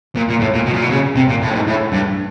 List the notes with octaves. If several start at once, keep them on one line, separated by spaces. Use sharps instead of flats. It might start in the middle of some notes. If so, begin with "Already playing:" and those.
A#2
A#2
A2
A#2
B2
A#2
B2
C#3
C3
A#2
A2
G2
G#2
A2
G2